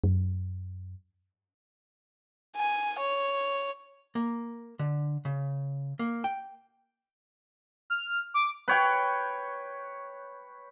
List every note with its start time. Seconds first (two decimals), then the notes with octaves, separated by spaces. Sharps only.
0.04 F#2
2.56 G#5
2.99 C#5
4.15 A#3
4.79 D3
5.25 C#3
5.99 A#3
6.24 G5
7.90 F6
8.34 D6
8.68 B4 C#5 G5